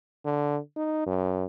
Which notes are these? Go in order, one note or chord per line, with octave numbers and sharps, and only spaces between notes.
D3
D#4
F#2